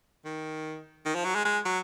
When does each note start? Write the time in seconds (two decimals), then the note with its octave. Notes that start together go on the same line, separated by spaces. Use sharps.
0.25 D#3
1.05 D#3
1.15 F3
1.25 F#3
1.35 G#3
1.45 G#3
1.65 F#3